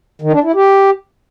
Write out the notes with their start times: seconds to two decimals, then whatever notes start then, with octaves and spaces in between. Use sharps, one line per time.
0.22 D#3
0.33 D4
0.44 E4
0.55 G4